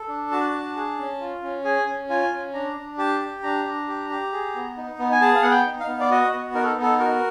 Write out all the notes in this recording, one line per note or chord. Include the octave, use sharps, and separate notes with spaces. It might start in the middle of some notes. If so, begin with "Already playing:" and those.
Already playing: A4
D4
F#4 A5
D4
G#4
C#4
F4
C#4
G#4 G#5
C#4
F4 G#5
C#4
D4 A#5
D4
G4 A5
G4
D4 A#5
D4
G4
G4
G#4
B3
D#4
B3
G#5
G#4 A5
F5
B3 F#5
G5
D#4
F5
B3
D5
F#4 D#5
B3
D#4 A#4
A4
B3
A4
F#4 A#4